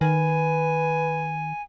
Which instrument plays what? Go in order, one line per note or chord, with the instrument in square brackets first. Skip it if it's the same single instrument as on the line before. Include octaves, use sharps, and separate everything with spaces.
[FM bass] D#3 [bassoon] B4 [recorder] G#5